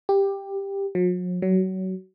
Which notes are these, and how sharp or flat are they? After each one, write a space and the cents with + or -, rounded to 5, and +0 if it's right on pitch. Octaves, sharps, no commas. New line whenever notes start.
G4 +10
F#3 -45
F#3 +25